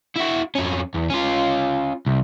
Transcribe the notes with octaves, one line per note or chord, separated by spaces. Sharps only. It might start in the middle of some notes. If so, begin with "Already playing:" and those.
E4 F#4
F2 C#4
E2
C#4 F4
C2